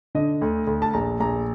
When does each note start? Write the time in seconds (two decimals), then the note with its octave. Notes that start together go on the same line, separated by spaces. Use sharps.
0.15 D3 D#5
0.41 D2
0.67 D2
0.82 A5
0.94 A#1 A#5
1.20 A#1 A#5